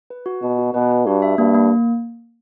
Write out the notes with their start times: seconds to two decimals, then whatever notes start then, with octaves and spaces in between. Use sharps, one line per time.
0.10 B4
0.26 F#4
0.42 B2 F#4
0.58 F#4
0.74 B2 B4
0.90 B4
1.06 G2 F#4
1.22 E5
1.38 G2 A#3
1.55 A#3